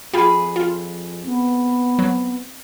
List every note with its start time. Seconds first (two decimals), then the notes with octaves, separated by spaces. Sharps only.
0.14 F2 F4 G4 G#4 G#5 B5
0.56 F4
1.25 B3 C4
1.99 F#3